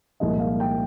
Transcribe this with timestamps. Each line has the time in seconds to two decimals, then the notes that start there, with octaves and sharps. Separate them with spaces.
0.20 C2 A#2 F3 G#3 D#5
0.40 F5
0.60 G5